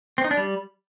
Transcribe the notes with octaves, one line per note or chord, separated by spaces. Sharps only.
C4
D#4
D4
G3